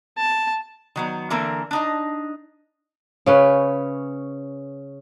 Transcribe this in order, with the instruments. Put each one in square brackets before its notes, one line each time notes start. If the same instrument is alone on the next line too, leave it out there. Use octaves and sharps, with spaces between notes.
[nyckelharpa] A5
[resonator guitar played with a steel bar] D#3 F#3 B3
D3 E3 A#3 C4 A4 A#4
D4 D#4 D#5
[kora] C#3 C#4 B4